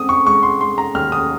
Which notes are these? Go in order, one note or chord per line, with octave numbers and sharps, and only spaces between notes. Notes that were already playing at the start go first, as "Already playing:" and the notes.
Already playing: G#3 C4 D#6
C#6
G#3 C#6
C6
G#3 C6
A#5
D#2 F6
D#6